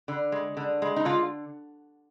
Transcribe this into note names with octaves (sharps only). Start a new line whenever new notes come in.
D3
G#3
D3
G#3
D#4
D3 F4